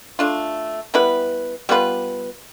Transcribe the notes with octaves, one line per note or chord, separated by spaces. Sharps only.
A3 D4 F4
G3 B3 E4 B4
G3 B3 F4 B4